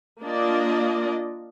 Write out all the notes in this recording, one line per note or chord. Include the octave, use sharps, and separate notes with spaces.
A#3 D4 F4 D5 D#5